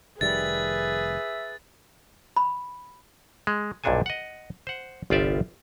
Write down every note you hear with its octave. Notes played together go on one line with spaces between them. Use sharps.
F1 D#3 G3 G#4 B4 E5 A6
B5
G#3
B1 G2 A#2 D4 A4 G#5
D#5 F#5
C5 F#5
G1 C2 F4 G4 D5 E5